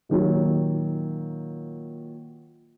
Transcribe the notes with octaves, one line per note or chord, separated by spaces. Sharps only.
A#2 D#3 F#3